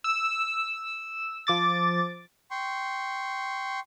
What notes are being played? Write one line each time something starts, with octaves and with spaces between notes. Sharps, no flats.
E6
F3 D6 A6
G5 C6 C#6